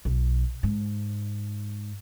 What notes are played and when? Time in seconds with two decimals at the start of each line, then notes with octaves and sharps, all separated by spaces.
0.05 B1
0.63 G#2